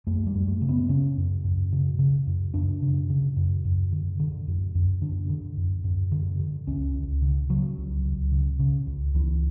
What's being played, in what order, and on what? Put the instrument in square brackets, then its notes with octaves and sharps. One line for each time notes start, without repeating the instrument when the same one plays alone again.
[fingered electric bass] F#2 A3
G3
F#2
A3
C#3
B3
C#3 C#4
F#2
F#2
C#3
C#3
F#2
F#2 D4
C#3
C#3
F#2
F#2
D3
D3
F#2
F#2
D3 D4
D3
F#2
F#2
D3
D3
C#2 C#4
C#2
C#3
C#3 F#3
C#2
C#2
C#3
C#3
C#2
C#2 E3